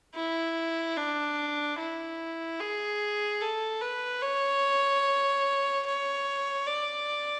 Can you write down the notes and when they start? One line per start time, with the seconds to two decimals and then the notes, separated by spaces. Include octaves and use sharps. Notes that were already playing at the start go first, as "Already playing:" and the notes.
0.15 E4
0.96 D4
1.78 E4
2.60 G#4
3.41 A4
3.81 B4
4.22 C#5
5.86 C#5
6.67 D5